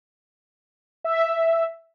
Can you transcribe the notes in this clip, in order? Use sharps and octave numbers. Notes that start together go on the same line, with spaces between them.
E5